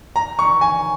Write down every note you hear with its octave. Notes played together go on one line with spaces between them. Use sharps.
A#5
C#6
G#5